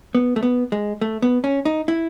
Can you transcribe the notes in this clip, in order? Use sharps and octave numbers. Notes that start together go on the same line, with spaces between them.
B3
A3
B3
G#3
A3
B3
C#4
D#4
E4